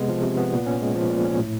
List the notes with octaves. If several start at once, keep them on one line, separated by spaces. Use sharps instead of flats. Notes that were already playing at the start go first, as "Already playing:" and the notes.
Already playing: C3 G#3 B3
F3
C3
B3
A#2
C#4
G#3
F3
A#2
C#4
A2